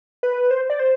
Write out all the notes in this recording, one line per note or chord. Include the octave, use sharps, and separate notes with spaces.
B4
C5
D5
C5